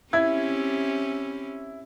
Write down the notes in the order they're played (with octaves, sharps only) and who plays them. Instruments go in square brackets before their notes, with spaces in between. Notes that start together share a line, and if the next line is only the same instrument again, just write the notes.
[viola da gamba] C4 C#4 G4 [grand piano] E4 G#6